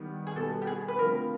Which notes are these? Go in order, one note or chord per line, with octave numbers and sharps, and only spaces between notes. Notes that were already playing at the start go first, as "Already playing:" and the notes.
Already playing: D#3 G3 B3
G#4
B2 G3 B3 A4
G4
G#4
B4
D3 F3 A3 C4 A#4